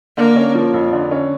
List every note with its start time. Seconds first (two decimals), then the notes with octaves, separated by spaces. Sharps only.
0.17 D3 A#3
0.36 C#4
0.55 F3
0.74 F2
0.93 D3
1.11 C#4